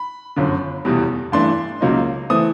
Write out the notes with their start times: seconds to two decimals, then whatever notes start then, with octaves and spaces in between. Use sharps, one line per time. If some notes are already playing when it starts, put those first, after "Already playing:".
Already playing: B5
0.36 G1 F#2 D3
0.85 F1 E2 B2 G3
1.32 G2 E3 A3 D4 C6
1.81 C#2 C#3 F#3 A#3 D#4
2.30 E3 A3 C4 D#6